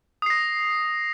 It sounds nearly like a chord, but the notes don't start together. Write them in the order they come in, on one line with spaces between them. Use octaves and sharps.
D#6 C7 A#6